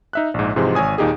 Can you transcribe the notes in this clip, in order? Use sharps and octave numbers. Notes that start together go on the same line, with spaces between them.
D#4 E5 F#6
A#1 G#2
G#2 C3 E3 F3 G#3 C5
G#1 C#5 G#5 D#6
D#2 A#2 D#4 G4 G#4